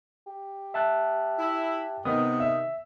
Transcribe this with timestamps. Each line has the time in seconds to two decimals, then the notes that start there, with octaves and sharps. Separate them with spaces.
0.27 G4
0.74 E5 A5 F#6
1.39 E4
2.05 C3 D#3 B3 D#6
2.40 E5